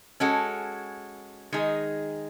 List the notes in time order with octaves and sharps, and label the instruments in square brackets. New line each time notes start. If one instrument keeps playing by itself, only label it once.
[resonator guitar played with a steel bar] G#3 C#4 F#4 A4
D#3 G#3 D#4 G#4